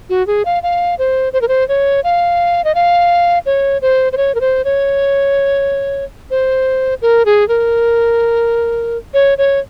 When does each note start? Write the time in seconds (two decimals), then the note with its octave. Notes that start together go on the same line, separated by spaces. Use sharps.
0.10 F#4
0.27 G#4
0.45 F5
0.63 F5
0.99 C5
1.33 C5
1.41 A#4
1.48 C5
1.68 C#5
2.04 F5
2.64 D#5
2.75 F5
3.46 C#5
3.82 C5
4.13 C5
4.17 C#5
4.35 A#4
4.41 C5
4.65 C#5
6.30 C5
7.02 A#4
7.25 G#4
7.48 A#4
9.14 C#5
9.38 C#5